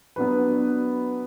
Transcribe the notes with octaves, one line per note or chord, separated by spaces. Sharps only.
F#3 B3 D4 F#4 B4